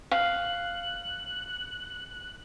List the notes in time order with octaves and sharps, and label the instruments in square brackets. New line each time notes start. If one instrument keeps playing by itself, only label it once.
[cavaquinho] F5 [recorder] F#6